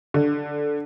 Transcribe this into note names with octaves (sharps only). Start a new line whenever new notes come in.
D3